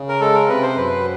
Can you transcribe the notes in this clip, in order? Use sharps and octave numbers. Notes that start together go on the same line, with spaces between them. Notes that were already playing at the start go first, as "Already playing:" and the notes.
Already playing: C#3
A#4
G#3 A4
A#4
C3 B4
C5
F#2 B4